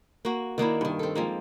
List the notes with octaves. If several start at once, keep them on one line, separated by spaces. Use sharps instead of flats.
A#3 F#4
D#3 A#3 D4 E4
G2 D#3
C4 A4
F3 G#3 A#3